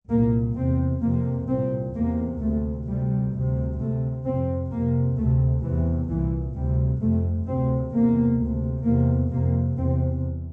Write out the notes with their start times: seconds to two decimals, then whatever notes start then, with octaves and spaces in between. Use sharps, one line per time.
0.09 C2 A#2 A#3
0.56 E2 C3 C4
1.02 F2 C3 A#3
1.48 C2 A#2 C4
1.94 E2 C3 A#3
2.40 D2 C3 A3
2.86 D2 C3 G3
3.32 D2 C3
3.79 D2 C3 A3
4.25 F2 C3 C4
4.71 F2 C3 A#3
5.16 D2 C3 A3
5.62 E2 C3 E3
6.08 C2 A#2 E3
6.55 D2 C3 G3
7.00 F2 C3 A3
7.47 D2 C3 C4
7.92 E2 C3 A#3
8.39 D2 C3
8.85 E2 C3 A#3
9.31 F2 C3 A#3
9.77 E2 C3 C4